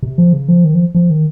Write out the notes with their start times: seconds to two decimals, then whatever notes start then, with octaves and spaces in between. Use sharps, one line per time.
0.03 C3
0.18 F3
0.33 C#3
0.48 F3
0.64 D#3
0.74 F3
0.95 F3
1.10 D#3